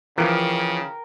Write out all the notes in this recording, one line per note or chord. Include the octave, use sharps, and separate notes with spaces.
C#3 E3 F3 A#4 G5